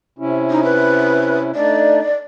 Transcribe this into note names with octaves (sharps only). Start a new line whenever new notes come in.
C3 C#4 E4
D#4
B4
A3 D4 D#4 D5